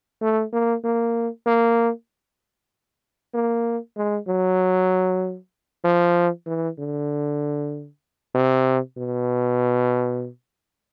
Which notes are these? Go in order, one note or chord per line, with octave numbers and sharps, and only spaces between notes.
A3
A#3
A#3
A#3
A#3
G#3
F#3
F3
E3
D3
C3
B2